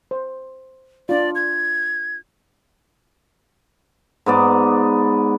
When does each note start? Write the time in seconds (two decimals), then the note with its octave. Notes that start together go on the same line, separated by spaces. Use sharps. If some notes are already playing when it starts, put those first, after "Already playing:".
0.11 C5
1.09 D4 F4 D5
1.35 G#6
4.26 G#2 B3 D5